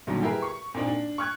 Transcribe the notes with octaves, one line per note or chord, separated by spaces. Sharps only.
B1 A#2 D3 D#3 F#3 G3
E4 G4 G#4 A#4 B4
C#6
A#2 A#3 C4 D4 D#4
D4
C#6 F6 F#6 G#6